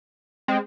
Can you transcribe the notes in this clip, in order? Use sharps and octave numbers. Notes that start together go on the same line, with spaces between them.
G#3 C4